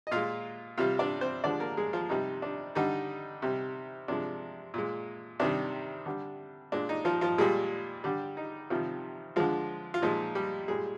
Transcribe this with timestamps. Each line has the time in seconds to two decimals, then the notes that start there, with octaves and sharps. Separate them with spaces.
0.07 D#5
0.11 A#2 G#3 F4 F5
0.78 C3 G3 F4 F5
0.99 D4 D5
1.21 C4 C5
1.44 D3 F3 G#3 D4 D5
1.60 A#3 A#4
1.77 G#3 G#4
1.93 F3 F4
2.09 C3 G3 D#4
2.42 D4
2.75 D3 G3 D#4
3.42 C3 G3
4.08 C3 F3 G#3 D4
4.74 A#2 G#3
5.40 C3 D#3 G3 D4
6.06 D3 G3
6.72 A#2 G#3 D4
6.89 D#4
7.05 F3 F4
7.21 F3 F4
7.38 A#2 G3 G#3 G#4
8.04 D3 G3 G4
8.37 D#4
8.70 C3 D#3 F3 G3 F4
9.36 D3 F3 G#3 F4
9.94 F4
10.02 A#2 F3 G#3 D#4
10.35 G3 G4
10.68 A#2 G3 G#3 G#4